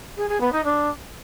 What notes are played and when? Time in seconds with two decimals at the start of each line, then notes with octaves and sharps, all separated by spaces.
0.17 G#4
0.29 G#4
0.40 B3
0.52 D#4
0.64 D4